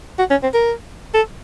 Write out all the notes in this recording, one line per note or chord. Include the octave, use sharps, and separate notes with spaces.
F#4
C#4
C4
A#4
A4